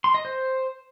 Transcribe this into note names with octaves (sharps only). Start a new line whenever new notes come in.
C6
D#5
C5